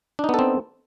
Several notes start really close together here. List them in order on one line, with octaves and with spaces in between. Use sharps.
D4 D#4 B3 A4 C4